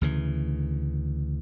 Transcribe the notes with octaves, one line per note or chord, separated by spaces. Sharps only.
D2 C#3 E3